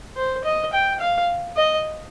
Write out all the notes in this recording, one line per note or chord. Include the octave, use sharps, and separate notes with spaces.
C5
D#5
G5
F5
D#5